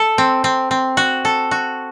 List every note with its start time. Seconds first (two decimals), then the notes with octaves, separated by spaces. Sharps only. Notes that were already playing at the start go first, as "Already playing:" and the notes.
Already playing: A4
0.18 C4
0.44 C4
0.71 C4
0.97 F#4
1.25 A4
1.51 F#4